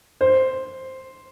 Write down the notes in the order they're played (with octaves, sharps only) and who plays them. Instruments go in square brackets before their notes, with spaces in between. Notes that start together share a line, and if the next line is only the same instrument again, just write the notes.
[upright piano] C5